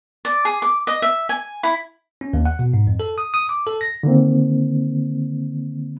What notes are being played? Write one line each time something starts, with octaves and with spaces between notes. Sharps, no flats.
D5
G#4
D6
D#5
E5
G#5
E4
C#4
D#2
F#5
B2
G#2
F2
A4
D#6
D#6
D6
A4
A#6
D3 D#3 A#3 C4